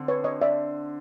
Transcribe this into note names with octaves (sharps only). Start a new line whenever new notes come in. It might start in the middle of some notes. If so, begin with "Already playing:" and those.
Already playing: D3 C4
B4 C#5
C#5 D#5
D5 E5